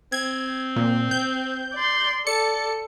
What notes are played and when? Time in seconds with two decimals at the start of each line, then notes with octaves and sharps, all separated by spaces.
0.12 C4 G#6
0.76 A#2
1.11 G6
1.74 D5 C6
2.27 A4 D5 C#7